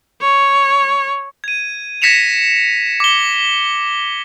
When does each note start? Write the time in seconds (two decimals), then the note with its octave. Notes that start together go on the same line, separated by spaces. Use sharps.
0.21 C#5
1.44 G#6 D#7
2.02 G#6 A#6 B6 C#7 E7 F7
3.00 D6 G7